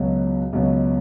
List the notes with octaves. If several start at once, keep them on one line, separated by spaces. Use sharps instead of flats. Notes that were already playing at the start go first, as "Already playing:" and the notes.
Already playing: C#2 B2 F#3
C#2 B2 F#3